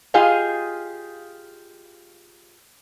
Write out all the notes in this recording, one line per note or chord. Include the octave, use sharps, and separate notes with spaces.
F4 G4 G#4 D#5 F5